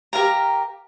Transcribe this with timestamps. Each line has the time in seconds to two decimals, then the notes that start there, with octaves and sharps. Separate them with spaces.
0.13 G4 A#4 F5 A#5